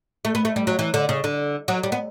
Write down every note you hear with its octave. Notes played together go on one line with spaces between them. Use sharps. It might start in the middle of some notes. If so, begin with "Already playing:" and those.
A3
B3
A3
G3
F#3
E3
D3
C#3
D3
F#3
G3
B3